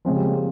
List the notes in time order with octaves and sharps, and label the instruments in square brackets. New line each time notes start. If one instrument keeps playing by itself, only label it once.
[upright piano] C#3 G#3 C4 [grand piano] F3
[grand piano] G3
A#3
G#3